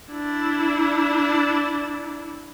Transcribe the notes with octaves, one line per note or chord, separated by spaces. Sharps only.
D4 E4